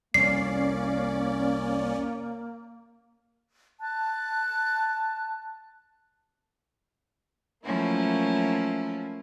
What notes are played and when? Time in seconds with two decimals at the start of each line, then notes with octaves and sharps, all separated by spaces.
0.14 C2 F2 A#3 C#4 D5 C7
3.81 A5 F#6
7.65 F3 F#3 A3 A#3 C#4 E4